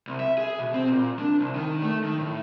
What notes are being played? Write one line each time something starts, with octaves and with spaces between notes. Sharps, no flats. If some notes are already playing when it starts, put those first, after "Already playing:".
C2
E5
G#4
B2
C4
A#2
D4
C2
D#3
A3
D#3
A2